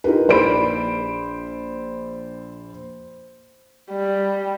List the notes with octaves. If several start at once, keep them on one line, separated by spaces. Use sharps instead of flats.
D#4 F4 G4 A#4 B4
A#1 C5 D5 B5 D7
G3